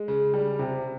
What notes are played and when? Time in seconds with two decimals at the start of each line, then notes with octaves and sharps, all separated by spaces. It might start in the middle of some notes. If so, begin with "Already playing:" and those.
Already playing: G#3
0.08 C#3
0.34 G3
0.59 C3